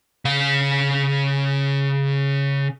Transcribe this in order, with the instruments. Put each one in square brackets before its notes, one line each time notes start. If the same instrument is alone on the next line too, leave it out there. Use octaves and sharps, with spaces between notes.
[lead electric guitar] C#3 F5